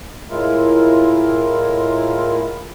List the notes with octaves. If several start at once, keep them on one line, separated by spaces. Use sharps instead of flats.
A2 G#3 E4 F4 A#4